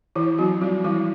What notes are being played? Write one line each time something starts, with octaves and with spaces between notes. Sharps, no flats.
E3 E4
F#3 C4 F#4
F3 G3 F4
E3 G3 E4